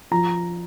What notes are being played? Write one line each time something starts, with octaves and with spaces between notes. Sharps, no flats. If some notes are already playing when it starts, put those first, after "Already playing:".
F3 A#5